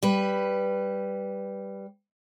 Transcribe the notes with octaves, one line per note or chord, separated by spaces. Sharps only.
G3 B4